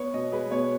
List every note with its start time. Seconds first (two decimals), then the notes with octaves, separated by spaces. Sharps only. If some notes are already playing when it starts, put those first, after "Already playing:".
Already playing: B3 C#5
0.14 B2 D#5
0.32 G#3 B4
0.51 B2 C#5